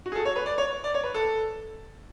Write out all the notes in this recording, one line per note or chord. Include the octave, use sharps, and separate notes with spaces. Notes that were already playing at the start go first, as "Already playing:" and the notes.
F#4
G#4
A4
C#5
B4
D5
C#5
D5
C#5
B4
A4